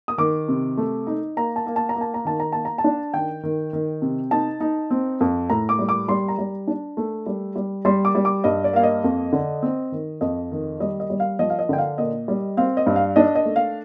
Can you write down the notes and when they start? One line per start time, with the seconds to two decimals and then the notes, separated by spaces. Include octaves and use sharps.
0.08 D#6
0.18 D#3 D6
0.48 C3
0.78 A3
1.07 D#4
1.37 A#3 A#5
1.56 A5
1.66 A#3
1.76 A5
1.89 A#5
1.96 A#3
2.01 A5
2.14 A#5
2.25 D#3 A5
2.40 A#5
2.52 A#3 A5
2.65 A#5
2.78 A5
2.84 D4
3.14 D#3 G5
3.43 D#3
3.73 D#3
4.02 C3
4.31 D#4 A5
4.60 D#4
4.91 C4
5.21 F2
5.50 A2 A#5
5.69 D6
5.79 G3
5.89 D6
6.08 G3 C6
6.28 A#5
6.38 G3
6.67 D4
6.97 A3
7.26 G3
7.56 G3
7.85 G3 C6
8.05 D6
8.15 G3
8.25 D6
8.44 G2 D#5
8.64 D5
8.73 A#3 F5
8.83 D#5
9.04 F2
9.33 D3
9.62 C4
9.92 D#3
10.21 F2 D#5
10.51 D#3
10.80 G3 D#5
11.00 D#5
11.10 G3
11.20 F5
11.39 F3 D#5
11.50 F5
11.59 D#5
11.69 D3 G5
11.78 F5
11.98 A#2 D#5
12.28 G3
12.57 C4 F5
12.77 D#5
12.86 G2
12.96 F5
13.16 D4 D#5
13.35 D#5
13.45 A3
13.56 F5